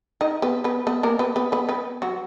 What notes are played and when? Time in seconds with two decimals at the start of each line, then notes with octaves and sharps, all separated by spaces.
0.21 D#4 D#5
0.42 B3 B4
0.64 B3 B4
0.87 B3 B4
1.03 A#3 A#4
1.19 B3 B4
1.36 B3 B4
1.52 B3 B4
1.69 B3 B4
2.02 F#3 F#4